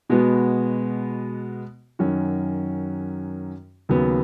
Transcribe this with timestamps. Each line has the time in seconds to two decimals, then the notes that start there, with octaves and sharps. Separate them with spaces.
0.10 B2 G#3 B3 F#4
1.99 F#2 D#3 F#3 C#4 F#4
3.89 D#2 C#3 F#3 B3